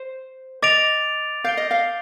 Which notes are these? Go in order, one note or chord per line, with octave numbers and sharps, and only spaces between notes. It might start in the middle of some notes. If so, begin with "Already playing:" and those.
Already playing: C5
D#5 D6 A6 D7 F7
F5 G6 D7 G7
D#5
F5